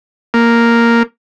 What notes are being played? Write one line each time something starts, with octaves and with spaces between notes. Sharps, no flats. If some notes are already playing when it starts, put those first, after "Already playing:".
A#3